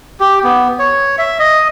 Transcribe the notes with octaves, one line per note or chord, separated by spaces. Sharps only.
G4
B3
C#5
E5
D#5